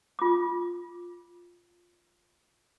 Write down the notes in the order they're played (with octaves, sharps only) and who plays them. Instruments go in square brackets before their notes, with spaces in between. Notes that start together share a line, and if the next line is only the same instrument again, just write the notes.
[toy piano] F4 D6